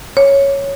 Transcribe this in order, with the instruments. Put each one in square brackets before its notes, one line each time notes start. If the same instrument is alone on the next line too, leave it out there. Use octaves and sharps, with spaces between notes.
[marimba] C#5